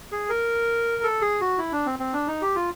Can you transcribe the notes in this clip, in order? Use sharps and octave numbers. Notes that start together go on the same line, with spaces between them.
G#4
A#4
A4
G#4
F#4
E4
D4
C4
C4
D4
D#4
G4
F4